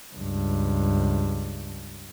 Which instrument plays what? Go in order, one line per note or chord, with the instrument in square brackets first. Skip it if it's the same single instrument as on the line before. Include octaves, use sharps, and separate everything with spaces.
[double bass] C#2 G2